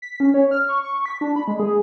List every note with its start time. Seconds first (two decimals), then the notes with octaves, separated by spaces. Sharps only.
0.02 B6
0.20 C#4
0.34 C#5
0.51 F6
0.68 C#6
0.83 C#6
1.06 B6
1.21 D4
1.36 B5
1.48 G#3
1.60 G#4